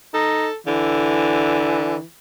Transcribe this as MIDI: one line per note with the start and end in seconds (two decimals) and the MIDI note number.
0.14 0.46 63
0.14 0.55 69
0.67 1.96 50
0.67 2.03 52